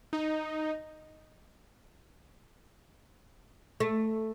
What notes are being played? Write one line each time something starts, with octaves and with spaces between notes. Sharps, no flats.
D#4 D#5
A3